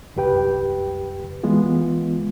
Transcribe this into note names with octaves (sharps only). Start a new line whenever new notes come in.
C2 F#2 G4 B4 G5
E3 G#3 B3 F4